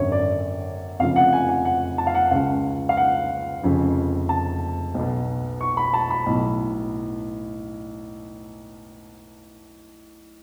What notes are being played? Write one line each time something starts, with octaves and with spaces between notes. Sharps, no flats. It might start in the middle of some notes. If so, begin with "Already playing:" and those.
Already playing: G#1 F#2 D3 C#5
D5
F1 F2 C#3 F5
F#5
G#5
F#5
F#5
A5
F5
F#5
C#2 C#3 F5
F5
F#5
F1 F2 C#3
A5
B1
B2
C#6
B5
A5
B5
B1 A2